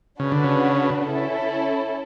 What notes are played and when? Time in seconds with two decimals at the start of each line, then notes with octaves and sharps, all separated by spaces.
0.20 C#3 D4 F#4 B4
0.32 D3
0.44 C#3
1.08 C#4 E4 A4